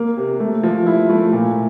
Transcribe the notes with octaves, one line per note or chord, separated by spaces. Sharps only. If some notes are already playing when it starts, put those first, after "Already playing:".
Already playing: A#3
C3
A3
F3
E4
A3
A#2